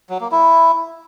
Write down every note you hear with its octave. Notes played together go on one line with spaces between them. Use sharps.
F#3
A#3
E4